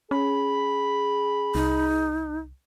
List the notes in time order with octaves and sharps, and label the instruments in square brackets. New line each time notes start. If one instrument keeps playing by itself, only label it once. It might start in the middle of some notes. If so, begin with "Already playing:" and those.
[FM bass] C#4 [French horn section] G#4 [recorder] B5
[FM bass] C2 [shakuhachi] D#4